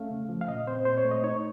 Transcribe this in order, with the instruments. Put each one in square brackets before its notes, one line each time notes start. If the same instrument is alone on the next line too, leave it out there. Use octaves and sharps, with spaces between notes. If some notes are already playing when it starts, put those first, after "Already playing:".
Already playing: [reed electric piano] A3 C#4 F5
C#3
F3
F5
A#2 D#5
C4 C5
A#2 C5
C#5
A3
D#5
D#4 C#5